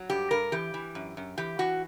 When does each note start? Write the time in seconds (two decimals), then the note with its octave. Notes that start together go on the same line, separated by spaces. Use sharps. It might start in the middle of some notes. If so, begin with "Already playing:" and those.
Already playing: F#3
0.10 G2 G4
0.31 G2 A#4
0.52 E3 G4
0.74 E3
0.95 F#2
1.17 F#2
1.38 E3 G4
1.59 E3 F#4